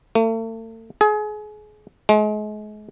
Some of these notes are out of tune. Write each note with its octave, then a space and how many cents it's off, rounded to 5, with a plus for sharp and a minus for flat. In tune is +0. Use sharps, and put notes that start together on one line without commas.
A3 +40
G#4 +30
G#3 +35